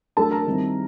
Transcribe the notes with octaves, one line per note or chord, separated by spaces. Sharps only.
F#3 A3 D4 A4 A5
A#4 A#5
D#3 G3 C4 E4